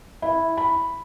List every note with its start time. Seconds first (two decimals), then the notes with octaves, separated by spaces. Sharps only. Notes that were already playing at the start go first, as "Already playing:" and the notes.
0.22 E4
0.57 B5